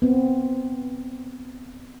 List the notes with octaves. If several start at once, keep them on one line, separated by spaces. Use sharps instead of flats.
B3 C4